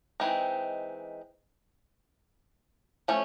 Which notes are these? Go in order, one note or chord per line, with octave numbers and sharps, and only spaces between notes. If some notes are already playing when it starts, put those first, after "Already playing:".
E3 G#3 C4 D#4
F3 A3 C#4